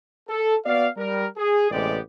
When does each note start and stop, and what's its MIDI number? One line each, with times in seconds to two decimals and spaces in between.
0.30 0.56 69
0.66 0.88 59
0.66 0.88 66
0.66 0.88 74
0.66 0.88 77
0.97 1.26 55
0.97 1.26 70
1.37 1.71 68
1.71 1.99 33
1.71 1.99 48
1.71 1.99 56
1.71 1.99 59
1.71 1.99 67
1.71 1.99 74